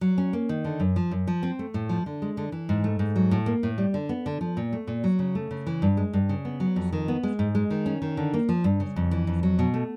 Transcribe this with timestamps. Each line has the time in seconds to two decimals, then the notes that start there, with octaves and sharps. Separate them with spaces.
0.01 F#3
0.18 C#4
0.33 A#3
0.49 D#3
0.64 D3
0.80 F#2
0.96 F3
1.11 F#2
1.27 F3
1.43 C4
1.59 A3
1.74 A2
1.89 F3
2.06 D3
2.22 G#3
2.37 D3
2.52 E3
2.69 G#2
2.84 A3
2.99 G#2
3.16 F#3
3.31 A2
3.46 A#3
3.63 A2
3.78 G3
3.94 D3
4.09 B3
4.26 D3
4.41 F3
4.57 A#2
4.73 A3
4.87 A#2
5.04 F#3
5.19 C#3
5.35 A3
5.51 C#3
5.67 E3
5.82 G2
5.97 G#3
6.13 G2
6.29 C#3
6.45 B3
6.60 F#3
6.76 F2
6.93 D#3
7.08 B3
7.23 G#3
7.39 G#2
7.55 G#3
7.71 D#3
7.86 C#4
8.02 D#3
8.17 D3
8.34 A#3
8.49 F3
8.64 G2
8.80 C#3
8.96 F2
9.11 E3
9.27 F2
9.43 F#3
9.59 B2
9.74 A3